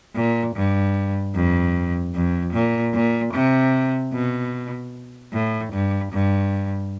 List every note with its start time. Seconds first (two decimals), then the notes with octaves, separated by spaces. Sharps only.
0.16 A#2
0.55 G2
1.35 F2
2.15 F2
2.53 A#2
2.94 A#2
3.34 C3
4.13 B2
5.33 A2
5.73 G2
6.12 G2